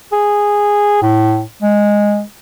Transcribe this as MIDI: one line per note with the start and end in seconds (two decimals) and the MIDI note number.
0.12 0.98 68
1.02 1.41 45
1.62 2.22 56